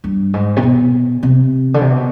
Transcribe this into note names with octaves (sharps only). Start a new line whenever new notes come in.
G2
G#2
C3
B2
C3
D3
C3
B2